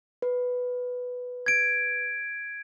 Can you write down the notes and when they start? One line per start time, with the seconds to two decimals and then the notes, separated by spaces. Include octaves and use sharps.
0.22 B4
1.46 G#6 D7